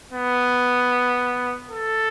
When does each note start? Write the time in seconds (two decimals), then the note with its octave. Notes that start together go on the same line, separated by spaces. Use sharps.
0.13 B3
1.71 A4